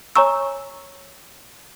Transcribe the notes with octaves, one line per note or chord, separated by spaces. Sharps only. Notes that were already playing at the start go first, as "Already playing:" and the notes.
C#5 G#5 A#5 C#6 E6